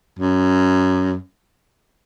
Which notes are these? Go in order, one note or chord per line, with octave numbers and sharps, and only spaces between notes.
F#2